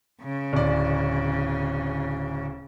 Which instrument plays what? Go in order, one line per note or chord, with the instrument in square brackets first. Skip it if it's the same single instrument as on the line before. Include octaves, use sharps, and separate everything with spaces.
[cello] C#3
[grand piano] D1 D5